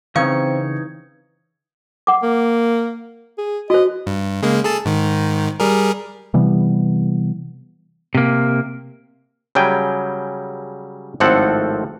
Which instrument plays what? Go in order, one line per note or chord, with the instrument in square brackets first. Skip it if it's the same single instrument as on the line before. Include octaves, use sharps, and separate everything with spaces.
[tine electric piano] C#3 C#6 C#7 [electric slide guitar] E3 D#4 C#5 [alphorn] C4 [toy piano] F5
[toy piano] F#5 D6
[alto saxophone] A#3
G#4
[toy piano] F#4 C5 [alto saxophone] D#5
[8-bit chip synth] G2
C#3 G#3 A#3
G#4 A4 A5
G#2 D#3
G3 G#4 A#4
[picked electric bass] C3 E3 G3 B3
[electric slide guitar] C3 A#3
[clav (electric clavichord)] C#3 F#3 G3 G5 G#5
G#1 A2 F3 C4 A4 F#5